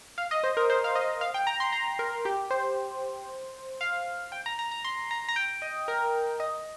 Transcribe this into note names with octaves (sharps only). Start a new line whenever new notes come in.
F5
D#5
C5
A#4
C5
F5
D#5
F5
G5
A#5
C6
A#5
A#4
G4
C5
F5
G5
A#5
A#5
A#5
C6
A#5
A#5
G5
D#5
A#4
D#5